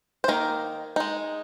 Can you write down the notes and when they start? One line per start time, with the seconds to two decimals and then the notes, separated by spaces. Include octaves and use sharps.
0.24 C5
0.28 D#3 A#3 D#4 A#4
0.96 G#3 D#4